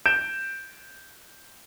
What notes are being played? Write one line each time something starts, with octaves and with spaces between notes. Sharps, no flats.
G6 D7 E7